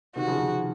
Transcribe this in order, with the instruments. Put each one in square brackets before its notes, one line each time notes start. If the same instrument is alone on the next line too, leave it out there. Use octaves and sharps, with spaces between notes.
[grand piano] C3 D#3 [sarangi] F#4
[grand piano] C#3 F3
C#3 F3